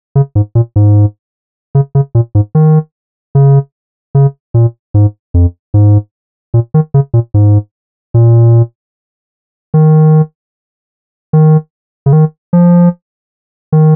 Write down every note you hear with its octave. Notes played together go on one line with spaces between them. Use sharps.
C#3
G#2
A#2
G#2
C#3
C#3
A#2
G#2
D#3
C#3
C#3
A#2
G#2
F2
G#2
A#2
D#3
C#3
A#2
G#2
A#2
D#3
D#3
C#3
D#3
F3
D#3